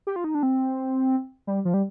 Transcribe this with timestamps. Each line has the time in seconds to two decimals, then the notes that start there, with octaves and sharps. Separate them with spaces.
0.07 G4
0.16 F4
0.24 D#4
0.35 D4
0.43 C4
1.47 G3
1.65 F3
1.74 G3